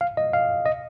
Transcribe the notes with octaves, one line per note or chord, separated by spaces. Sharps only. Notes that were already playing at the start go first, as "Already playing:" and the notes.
F5
D#5
F5
D#5